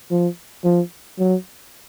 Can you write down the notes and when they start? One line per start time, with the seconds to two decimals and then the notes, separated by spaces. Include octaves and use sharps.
0.11 F3
0.64 F3
1.18 F#3